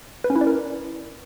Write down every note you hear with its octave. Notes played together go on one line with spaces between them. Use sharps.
B4
C#4
E4
D5
A#4